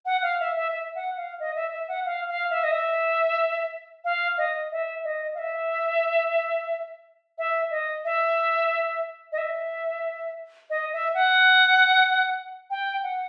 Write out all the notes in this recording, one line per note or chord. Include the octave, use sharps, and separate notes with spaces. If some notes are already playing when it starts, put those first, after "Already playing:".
F#5
F5
E5
E5
E5
F#5
F5
D#5
E5
E5
F#5
F5
F5
E5
D#5
E5
F5
D#5
E5
D#5
F5
E5
E5
D#5
E5
D#5
E5
D#5
E5
F#5
G5
F#5